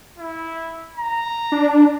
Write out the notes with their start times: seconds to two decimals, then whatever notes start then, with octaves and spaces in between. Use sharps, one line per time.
0.19 E4
0.98 A#5
1.52 D4